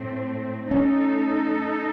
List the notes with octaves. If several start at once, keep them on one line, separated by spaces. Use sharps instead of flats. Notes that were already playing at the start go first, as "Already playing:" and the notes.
Already playing: A2 A3 C4
A3 C#4 D#4 A4